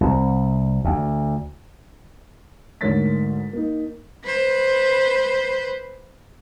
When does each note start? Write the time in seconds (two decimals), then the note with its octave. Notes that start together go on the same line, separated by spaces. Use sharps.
0.01 C2
0.85 D2
2.81 D2 G#2 A#4 C#5 A6 B6
3.53 A#3 D#4
4.25 B4 C5